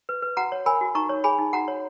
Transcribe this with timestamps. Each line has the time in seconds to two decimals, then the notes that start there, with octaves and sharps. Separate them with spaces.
0.09 B4
0.22 B4
0.37 F#4 F#5 A#5
0.52 C#5
0.66 A#4 G#5 B5
0.81 F#4
0.95 D#4 A#5 C#6
1.09 C#5
1.24 G#4 G#5 B5
1.39 D#4
1.53 F#4 F#5 A#5
1.68 C#5